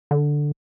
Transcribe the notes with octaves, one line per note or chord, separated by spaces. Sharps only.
D3